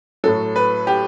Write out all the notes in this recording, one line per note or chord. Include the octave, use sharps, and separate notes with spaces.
A2 F#3 A4
B4
G4